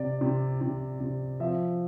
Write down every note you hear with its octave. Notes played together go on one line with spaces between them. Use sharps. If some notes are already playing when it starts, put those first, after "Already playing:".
Already playing: C3 D5
C3
C3
C3
F3 E5